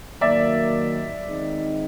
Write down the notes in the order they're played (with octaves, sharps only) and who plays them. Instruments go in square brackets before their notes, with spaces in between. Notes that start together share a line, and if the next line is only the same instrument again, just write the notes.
[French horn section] D#3 F#3 A#3 [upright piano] D5 E5
[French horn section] D#3 G#3 C4 D#4